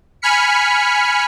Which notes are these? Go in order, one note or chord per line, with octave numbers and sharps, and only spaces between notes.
G#5 B5 F6 B6 C#7